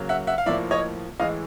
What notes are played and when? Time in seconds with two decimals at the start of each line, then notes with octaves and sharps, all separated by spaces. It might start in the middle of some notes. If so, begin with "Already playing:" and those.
Already playing: C#3 F#3 A#3
0.09 E5 F#5
0.27 E5 F#5
0.38 F5
0.46 A2 F3 A#3 D5 E5
0.71 C#5 D#5
1.20 A2 E3 G#3 D#5 F5